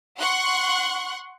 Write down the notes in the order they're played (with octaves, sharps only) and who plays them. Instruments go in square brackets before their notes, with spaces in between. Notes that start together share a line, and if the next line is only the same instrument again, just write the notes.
[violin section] F#5 C6 C#6 F#6